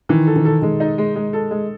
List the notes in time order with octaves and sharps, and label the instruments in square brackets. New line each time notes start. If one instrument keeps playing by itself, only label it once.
[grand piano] D#3 [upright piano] E3
[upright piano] A4
[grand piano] D#3
[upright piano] A4
[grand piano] D#3 [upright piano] G#3
[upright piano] D#4
G#3
G#3
A4
G#3